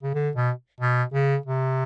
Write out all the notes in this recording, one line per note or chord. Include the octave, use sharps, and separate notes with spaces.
C#3
D3
B2
B2
C#3
C3